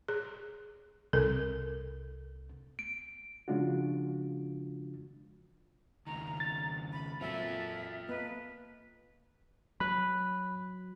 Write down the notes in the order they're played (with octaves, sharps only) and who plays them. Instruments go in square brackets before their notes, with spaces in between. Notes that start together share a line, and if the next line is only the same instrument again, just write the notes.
[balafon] G#4
[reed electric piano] C2 [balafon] A4 A#4
[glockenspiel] D7
[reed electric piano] C#3 F3 G#3 D4 F4 F#4
[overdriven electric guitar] C#2 D#3 [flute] A#5
[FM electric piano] A6
[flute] B5
[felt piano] A#2 F#3 C4 [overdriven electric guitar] F4 A4 [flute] E5
[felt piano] A#3 D#5 [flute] B4
[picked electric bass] F#3 [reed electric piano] B5 F#6